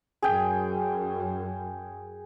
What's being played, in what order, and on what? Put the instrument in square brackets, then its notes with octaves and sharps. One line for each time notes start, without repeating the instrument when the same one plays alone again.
[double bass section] F#2 [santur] G#4 G5